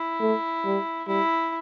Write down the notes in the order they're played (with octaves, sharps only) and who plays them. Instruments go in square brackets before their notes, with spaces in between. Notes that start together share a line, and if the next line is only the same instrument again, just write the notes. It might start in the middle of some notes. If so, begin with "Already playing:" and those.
Already playing: [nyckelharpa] E4
[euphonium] A3
G3
[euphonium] G3 [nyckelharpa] E4